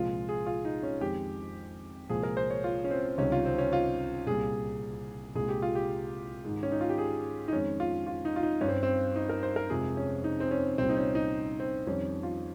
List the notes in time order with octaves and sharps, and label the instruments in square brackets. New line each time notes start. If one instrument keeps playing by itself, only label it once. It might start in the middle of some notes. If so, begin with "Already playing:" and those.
Already playing: [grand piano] C2 A#2 F3 G#3 F4
G#4
F4
D#4
C#4
F2 D#3 G#3 G4
C2 A#2 F3 G#3 G#4
A#4
C5
C#5
F4
C#4
C4
C#2 C3 D#3 G3 C#4
F4
C4
C#4
F4
C2 A#2 G3 G#4
C2 A#2 G#3 G#4
G4
F4
G4
G#2 D#3 G#3
C#4
D#4
F4
G4
G#4
D#4
F2 D#3 G#3 C#4
F4
F4
D#4
F4
D#4
G2 G3 C#4
C4
C4
D#4
A#4
C5
A#4
F2 C3 F3 G#3 G#4
C#4
D#4
C4
C#4
C2 A#2 G3 C4
D#4
C#4
D#4
C4
F2 D#3 G3 C#4
F4